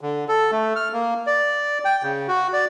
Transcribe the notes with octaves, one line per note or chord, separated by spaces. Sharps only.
D3
A4
A3
F6
A#3
D5
G5
C#3
F#4
D5